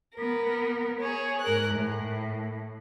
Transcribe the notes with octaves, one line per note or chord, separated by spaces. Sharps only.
B3 A#4
G#4 C#5
G#2 A#4 F#6
A2